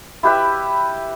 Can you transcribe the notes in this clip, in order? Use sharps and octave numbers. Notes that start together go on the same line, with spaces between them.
E4 G4 B4 E5